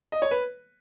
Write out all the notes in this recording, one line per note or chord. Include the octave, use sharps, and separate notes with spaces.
D#5
C#5
B4